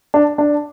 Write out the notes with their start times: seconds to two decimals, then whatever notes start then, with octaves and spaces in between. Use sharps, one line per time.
0.14 D4
0.38 D4